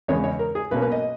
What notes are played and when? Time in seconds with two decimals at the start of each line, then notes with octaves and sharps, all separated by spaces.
0.08 E2 C#3 G#3 B3 C#5
0.24 C#5
0.39 A#4
0.55 G#4
0.71 B1 B2 A#3 C#4 B4
0.82 B4
0.92 D#5